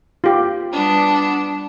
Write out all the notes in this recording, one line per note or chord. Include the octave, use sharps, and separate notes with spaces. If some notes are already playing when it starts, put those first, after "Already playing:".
F4 G4
G3 B3 D4